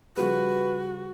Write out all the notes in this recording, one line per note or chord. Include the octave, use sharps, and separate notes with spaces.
C#3 F3 G3 F#4 B4